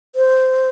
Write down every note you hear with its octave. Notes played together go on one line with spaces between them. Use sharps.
C5